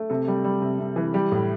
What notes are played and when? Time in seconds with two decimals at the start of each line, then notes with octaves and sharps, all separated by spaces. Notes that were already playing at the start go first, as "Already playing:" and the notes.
Already playing: A3
0.10 C3 A4
0.28 G3
0.44 G3
0.62 C3
0.80 C3
0.96 E3
1.14 G3 G4
1.32 A2